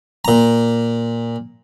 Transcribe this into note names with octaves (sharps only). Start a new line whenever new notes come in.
A#2 A#5